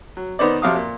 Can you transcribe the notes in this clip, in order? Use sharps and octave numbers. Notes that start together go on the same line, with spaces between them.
F#3
D#3 B3 D#4 C5 D5
F2 C3 F#3 F5 D6 D#6
A#2